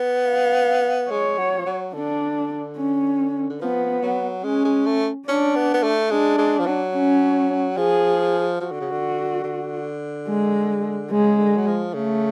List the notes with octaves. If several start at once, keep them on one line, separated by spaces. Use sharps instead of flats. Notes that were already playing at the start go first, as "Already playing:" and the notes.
Already playing: B3
F5
G#3 C#5
F#3
F3
F#3
D3 D4
C#4
D3
F3 B3
F#3
G#3 C#4
G#3
A3
C#4 D4
B3
B3
A3
G#3 D4
G#3
F3
F#3
C#4
F3 G#4
F3 F#4
D3
C#3
D3
D3
G#3
C#3 G#3
D3
F#3
F3
C#3 A3